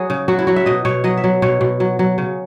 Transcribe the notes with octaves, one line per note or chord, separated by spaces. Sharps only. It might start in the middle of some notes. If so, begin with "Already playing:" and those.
Already playing: F#3 F#4 G#4
C#3
F#3 F#4
E4
F#3 F#4
E5
B2 D#5
B2 C#5
F#3 D#5
E5
F#3
B2 C#5
B2
F#3
F#3
C#3